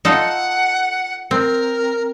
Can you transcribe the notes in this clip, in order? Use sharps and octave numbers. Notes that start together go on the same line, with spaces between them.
D#4 F4 A4 F#5
C4 A#4